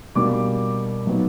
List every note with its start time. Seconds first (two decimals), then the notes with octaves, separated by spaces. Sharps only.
0.15 B2 G3 A#3 D4 D6
1.06 A#2 F#3 B3 D#4